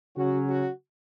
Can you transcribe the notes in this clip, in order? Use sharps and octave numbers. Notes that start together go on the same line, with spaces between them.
C#3 F#3 C#4 F#4
F#4